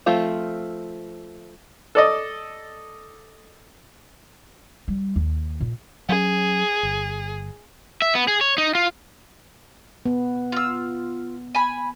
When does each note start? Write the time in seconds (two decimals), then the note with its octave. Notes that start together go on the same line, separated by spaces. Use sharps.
0.06 F3 A3 C4 F4
1.95 A4 D5 D#5
4.88 G3
5.16 D#2
5.60 A#2
6.09 F#3 C#4 G#4
6.83 G1
8.02 E5
8.15 B3
8.28 G#4
8.41 C#5
8.58 D#4
8.75 F4
10.06 B3
10.52 F4 E6
11.55 G#5 B5